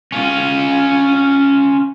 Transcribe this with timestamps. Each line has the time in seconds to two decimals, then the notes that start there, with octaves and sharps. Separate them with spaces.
0.12 C#4 F4